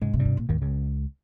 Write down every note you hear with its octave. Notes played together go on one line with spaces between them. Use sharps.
G#2 C#3 G#3
C3
G2 G3
C3
A#2
D#2 G#2 D#3
C#2 C#3